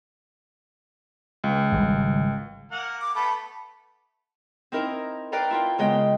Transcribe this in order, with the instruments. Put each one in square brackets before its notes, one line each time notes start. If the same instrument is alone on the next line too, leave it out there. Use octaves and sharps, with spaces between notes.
[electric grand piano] C#2
[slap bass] G#1 C#3 G3
[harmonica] A#3 A#4 F#5
[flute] D6
[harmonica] A3 B3 A4 [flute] B5
[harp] C4 D#4 E4 A#4
A#4 B4 D5 F5 G5 A#5
E4 F4 G5
C#3 G#3 B3 D#5 G5